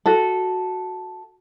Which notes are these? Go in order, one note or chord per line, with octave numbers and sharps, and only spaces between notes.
F#4 A4